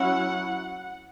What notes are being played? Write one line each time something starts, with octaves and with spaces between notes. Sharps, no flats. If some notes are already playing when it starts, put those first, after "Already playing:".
Already playing: F#3 C#4 E4 F#5